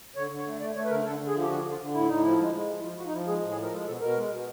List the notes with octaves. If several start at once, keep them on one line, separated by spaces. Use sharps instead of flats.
D3 C#5
D3
C#5
A3
A3 D5
A3 C#5
B4
D3 A#4
D3 A4
D3
G#4
F3
G4
D3 F#4
D3
F4
D3
A2 E4
A2 D#4
F3 E4
G#3
G#3
F3
E4
F3 F4
F3 F#4
D#4
F3 E4
G#3 G#4
A2
G#4
F3
A#4
G#3 A4
B2 A4
B2 A#4
G#3
B2